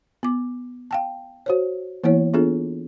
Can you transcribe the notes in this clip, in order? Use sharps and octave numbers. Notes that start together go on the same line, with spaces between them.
B3 D6
F5 G5 A5
F#4 C5 C#5
E3 A#3 B3 E4 C#5
B3 D4 F4 G#4 A4